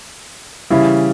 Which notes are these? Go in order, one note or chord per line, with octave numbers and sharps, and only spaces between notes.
C#3 E3 G3 E4